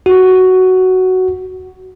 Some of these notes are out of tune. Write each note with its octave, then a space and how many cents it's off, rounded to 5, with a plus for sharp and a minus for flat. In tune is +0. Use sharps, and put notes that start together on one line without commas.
F#4 +10